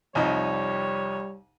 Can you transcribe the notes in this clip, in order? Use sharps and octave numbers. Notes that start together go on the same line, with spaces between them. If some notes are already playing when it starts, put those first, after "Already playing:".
C2 F2 G3 D#4 C#5